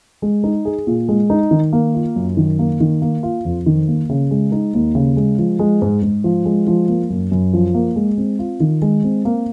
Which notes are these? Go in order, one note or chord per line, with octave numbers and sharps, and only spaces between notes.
G#3
D#4
G#4
A#2
G#3
D#4
D#3
A#3
F4
F#2
D#3
A#3
D#3
A#3
F4
F2
D#3
A#3
C#3
G#3
D#4
D#2
C#3
G#3
F3
G#3
G#2
G#2
F3
G#3
F3
A#3
F#2
F#2
F3
A#3
G#3
C4
F4
D#3
G#3
C4
A#3